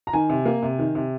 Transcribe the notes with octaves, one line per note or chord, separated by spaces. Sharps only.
A#5
D#3 G#5
C3
A#3
C3
D#3
C3